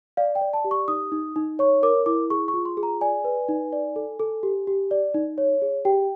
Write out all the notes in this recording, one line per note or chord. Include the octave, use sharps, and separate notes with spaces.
D5 F5
G5
D5
A5
G4
C#6
D#4 D#6
D#4
D#4
C#5 C#6
A#4 D6
E4 D6
G#4 C#6
C#6
F4
C6
G#4
A#5
D5 G#5
B4
D#4
D5
A4
A4
G4
G4
D5
D#4
C#5
G#4
G4 G5